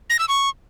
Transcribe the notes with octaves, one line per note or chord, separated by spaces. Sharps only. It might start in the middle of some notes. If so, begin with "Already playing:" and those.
A#6
E6
C#6